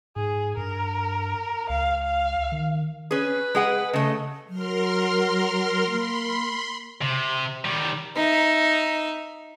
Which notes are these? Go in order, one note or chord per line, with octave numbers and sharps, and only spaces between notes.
G#2 G#4
G2 A#4
C#2 F5
F5
D#3
C#4 G#4 B4
G#3 G#4 F#5
C#3 A3 D#5
F#3 A#4 C6 F6
A#3 B5 C6
C3
D#3 G3
D#4 E5